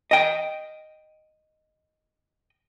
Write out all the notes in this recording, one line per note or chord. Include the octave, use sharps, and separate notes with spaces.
D#5 G5